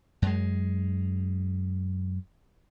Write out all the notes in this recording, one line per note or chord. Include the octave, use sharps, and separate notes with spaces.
F#2 G#3